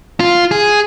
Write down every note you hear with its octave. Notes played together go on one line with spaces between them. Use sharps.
F4
G#4